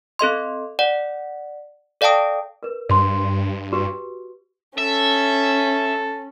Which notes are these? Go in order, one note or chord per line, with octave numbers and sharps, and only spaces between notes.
C4 A4 D#5 C6
D5 F#5
A4 D5 F5 G5 A5 D#6
A#4 B4
G2 C5 C6
F#4 G4 B4
C#4 A4 E5